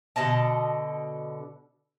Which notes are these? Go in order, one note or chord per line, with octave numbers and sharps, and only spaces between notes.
B2 D3 D#5 A5